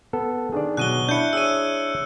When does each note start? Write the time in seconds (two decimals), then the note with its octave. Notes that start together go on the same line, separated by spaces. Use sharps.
0.13 B3 A4
0.52 D#3 D4 G#4 D5
0.77 B2 F#3 F#6 D#7 G7
1.09 D4 E4 G6 C#7
1.33 G#4 C#5 E6 D#7